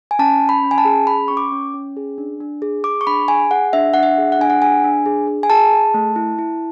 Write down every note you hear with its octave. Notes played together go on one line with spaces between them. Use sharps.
G#5
C#4 A5
C#4
B5
C#4
G#5
A5
G#4
C#4 B5
C#4 C#6
D6
C#4
C#4
G#4
D4
D4
G#4
G#4 D6
C#6
D4 B5
G#4 G#5
G#4 F#5
D4 E5
D4 F#5
E5
G#4
F#5
D4 G#5
F#5
G#4 G#5
D4
G#4
G#4
G#5
G#4 A5
G#4
A3
E4
E4